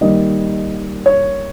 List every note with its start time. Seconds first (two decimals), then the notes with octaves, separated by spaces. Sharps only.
0.01 D#3 G3 A#3 D#5
1.06 C#5